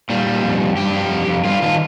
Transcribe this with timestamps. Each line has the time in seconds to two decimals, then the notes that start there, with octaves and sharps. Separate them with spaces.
0.10 A#2 G3
0.26 A#2
0.43 F2
0.61 F2
0.77 G2 G4
0.95 F3
1.11 F2
1.27 F2
1.45 G2 F4
1.62 D#3 F4